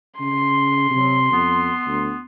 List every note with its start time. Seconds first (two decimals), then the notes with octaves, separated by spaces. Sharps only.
0.20 C#3 C6
0.91 C3 F#3
1.32 F2 B3
1.87 D2